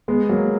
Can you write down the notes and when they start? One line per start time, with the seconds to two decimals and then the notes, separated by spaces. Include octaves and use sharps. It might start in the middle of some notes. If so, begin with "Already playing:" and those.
0.08 G#3 B3
0.29 F#3 A#3